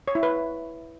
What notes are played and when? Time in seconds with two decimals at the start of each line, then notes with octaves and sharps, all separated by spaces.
0.08 C#5
0.15 E4
0.23 B4